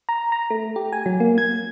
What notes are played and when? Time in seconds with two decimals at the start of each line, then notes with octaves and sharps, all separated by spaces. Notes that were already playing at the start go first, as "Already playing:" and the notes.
0.09 A#5
0.32 A#5
0.50 A3
0.76 G4
0.93 G#5
1.06 F#3
1.20 A#3
1.38 G#6